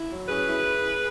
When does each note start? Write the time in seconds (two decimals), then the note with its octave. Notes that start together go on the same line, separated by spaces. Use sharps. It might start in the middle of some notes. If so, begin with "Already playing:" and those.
Already playing: E4
0.11 F#3
0.28 C#4 G#4 B4
0.47 E4